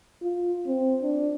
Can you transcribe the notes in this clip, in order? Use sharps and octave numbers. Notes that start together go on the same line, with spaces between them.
F4
C4
D4